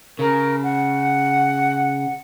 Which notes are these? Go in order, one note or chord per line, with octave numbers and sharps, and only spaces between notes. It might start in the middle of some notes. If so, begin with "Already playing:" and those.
C#3 A#4
F#5